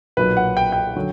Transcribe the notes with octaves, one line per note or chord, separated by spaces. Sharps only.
B1 A#2 F#3 B4
F#5
G5
G5
D3 F#3